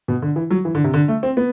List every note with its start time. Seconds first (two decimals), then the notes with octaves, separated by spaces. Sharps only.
0.08 B2
0.22 D3
0.36 E3
0.50 F#3
0.65 E3
0.75 D3
0.84 C3
0.94 D3
1.08 A3
1.23 C4
1.37 B3